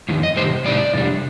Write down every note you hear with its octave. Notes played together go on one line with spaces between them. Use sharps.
F2 D#3
D#5
C3 D#3 G3 C5
A2 G3 C4 D#4 D5
F2 C3 G3 D4